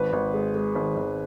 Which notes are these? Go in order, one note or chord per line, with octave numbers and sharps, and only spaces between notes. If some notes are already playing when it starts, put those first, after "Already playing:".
Already playing: G#1 B4
G#1
G#3
G#3
G#1
G#1